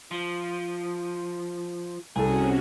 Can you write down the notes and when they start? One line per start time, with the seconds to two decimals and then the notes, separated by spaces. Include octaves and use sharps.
0.11 F3
2.16 C2 C3 C#4 F#4 G#4 A4